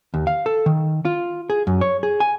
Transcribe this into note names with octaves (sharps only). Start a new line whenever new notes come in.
D#2
F5
A4
D#3
F4
G#4
F#2
C#5
G#4
G#5